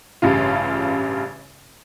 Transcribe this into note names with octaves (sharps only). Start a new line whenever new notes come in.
A1 G2 C#3 F4